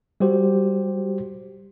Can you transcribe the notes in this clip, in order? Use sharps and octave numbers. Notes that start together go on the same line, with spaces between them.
G3 F#4 G4 C5